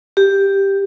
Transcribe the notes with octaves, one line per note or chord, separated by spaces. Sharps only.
G4